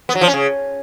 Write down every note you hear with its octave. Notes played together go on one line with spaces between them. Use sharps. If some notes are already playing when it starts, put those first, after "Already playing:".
B3
F#3
F3
C#4
C#3